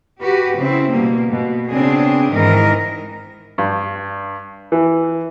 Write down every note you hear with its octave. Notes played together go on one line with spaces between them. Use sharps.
F#4 G4 B4
C#3 C4 E4
B2 G3 A#3
B2
C#3 B3 C4 D4 G#4
G#2 D#3 E3 A#4 D#5
G2
E3